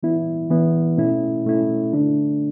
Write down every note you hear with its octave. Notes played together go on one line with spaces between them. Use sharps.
E3 B3 E4
E3 B3 E4
B2 A3 C#4 E4
B2 A3 C#4 E4
D3 A3 D4